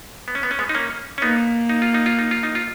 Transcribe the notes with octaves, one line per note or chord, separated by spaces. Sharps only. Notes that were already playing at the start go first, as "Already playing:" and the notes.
B3
C#4
B3
C#4
G#3 B3
D#4
A#3 C#4
C#4
A#3 B3 D#4
D#4
F4
D#4
F4
D#4
F4
D#4
F4